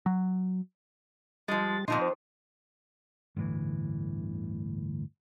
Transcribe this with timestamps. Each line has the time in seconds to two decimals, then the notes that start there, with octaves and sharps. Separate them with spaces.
0.06 F#3
1.48 F3 G3 G#3 A6
1.88 F2 A#2 F3 D#4 C6
2.02 C5
3.36 G1 D2 A2 E3